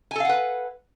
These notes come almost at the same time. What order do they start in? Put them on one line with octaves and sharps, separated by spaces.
G#5 A4 F5 F#5 B4